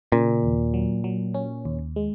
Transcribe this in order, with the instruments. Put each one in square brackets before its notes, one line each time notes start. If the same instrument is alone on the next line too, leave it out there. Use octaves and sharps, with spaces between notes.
[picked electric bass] A#2 [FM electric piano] C#3
[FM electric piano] D#2
F#3
F#3
C#4
D#2
G#3